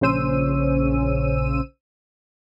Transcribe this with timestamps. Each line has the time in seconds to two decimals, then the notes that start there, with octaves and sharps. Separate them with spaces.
0.01 A#1 C#3 C#4 C5 E6 D#7